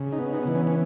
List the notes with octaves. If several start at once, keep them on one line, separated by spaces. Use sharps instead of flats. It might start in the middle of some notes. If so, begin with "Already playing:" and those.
Already playing: C#3
D#4
B3
D#4
E3
C#4
C#4